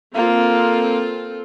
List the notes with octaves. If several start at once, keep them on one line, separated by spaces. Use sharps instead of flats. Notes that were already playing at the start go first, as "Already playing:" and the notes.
A#3 C4 F4 A4